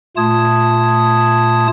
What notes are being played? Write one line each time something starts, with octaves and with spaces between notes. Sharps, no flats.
A#2 A3 F4 A5 D#6 G#6